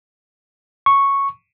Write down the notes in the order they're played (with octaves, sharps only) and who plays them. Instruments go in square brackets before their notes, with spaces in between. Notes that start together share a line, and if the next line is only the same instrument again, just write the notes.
[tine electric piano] C#6